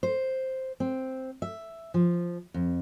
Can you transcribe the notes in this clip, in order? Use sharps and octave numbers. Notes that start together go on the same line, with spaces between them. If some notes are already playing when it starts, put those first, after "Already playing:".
C5
C4
E5
F3
F2